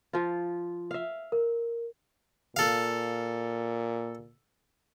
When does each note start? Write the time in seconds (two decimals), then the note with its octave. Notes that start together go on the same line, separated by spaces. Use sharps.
0.13 F3 F4
0.91 E5 F5
1.32 A#4
2.56 A#2 A4 F5